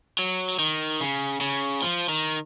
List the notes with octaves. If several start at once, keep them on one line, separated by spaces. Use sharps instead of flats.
F#3
D#3
C#3
C#3
F3
D#3